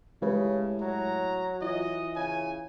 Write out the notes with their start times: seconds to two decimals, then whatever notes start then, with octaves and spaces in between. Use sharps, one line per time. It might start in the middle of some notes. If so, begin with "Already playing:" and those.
0.22 A2 C#3 G#3 G4 B4
0.81 F#3 A#5
1.61 E3 F4 D#5
2.16 C#3 G#5